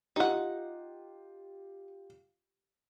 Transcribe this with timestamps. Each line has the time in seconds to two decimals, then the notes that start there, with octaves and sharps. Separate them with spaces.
0.16 D#4 F4 G4 F#5